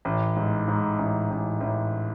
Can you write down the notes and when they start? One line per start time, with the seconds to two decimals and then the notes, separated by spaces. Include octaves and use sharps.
0.05 A1
0.36 G#2
0.68 G#2
0.99 A1
1.30 A1
1.60 A1